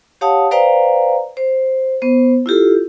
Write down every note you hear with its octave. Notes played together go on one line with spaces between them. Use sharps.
G4 C#5 F5 F#5 A5 D#6
B4 C5 D5 F5 G5 A#5
C5
B3 C5
E4 F4 G4 A4